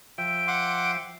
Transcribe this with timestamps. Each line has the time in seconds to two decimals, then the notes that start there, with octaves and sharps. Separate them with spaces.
0.18 F3 E5 G5 D7
0.48 F#5 C6 D6